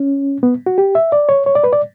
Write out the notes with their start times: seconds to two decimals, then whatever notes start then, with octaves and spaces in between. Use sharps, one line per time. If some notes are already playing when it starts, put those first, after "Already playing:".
Already playing: C#4
0.43 B3
0.66 F#4
0.78 G4
0.95 E5
1.12 D5
1.29 C#5
1.46 C#5
1.55 D5
1.64 B4
1.73 D5